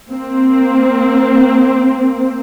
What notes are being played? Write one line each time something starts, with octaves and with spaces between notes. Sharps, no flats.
A#3 C4